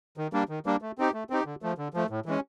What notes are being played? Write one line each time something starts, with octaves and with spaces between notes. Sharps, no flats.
D#3
G3 A#3 D4
D#3
G3 A#3 D4
A3
C4 D#4 G4
A3
C4 D#4 G4
D3
F3 A3
D3
F3 A3
A2
E3 G#3 C#4